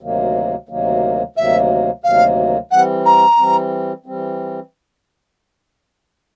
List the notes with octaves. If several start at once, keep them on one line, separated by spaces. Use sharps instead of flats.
D2 C3 D#3 F#3 A#3
D2 C3 D#3 F#3 A#3
D2 C3 D#3 F#3 A#3 E5
D2 C3 D#3 F#3 A#3 F5
E3 G3 C4 F#5
A#5
E3 G3 C4
E3 G3 C4